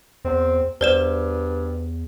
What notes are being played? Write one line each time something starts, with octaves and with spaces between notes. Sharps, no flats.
E2 C4
E2 G2 C5 D5 E7